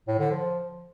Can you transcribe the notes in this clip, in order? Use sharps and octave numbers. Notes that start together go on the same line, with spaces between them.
A2
D3
F3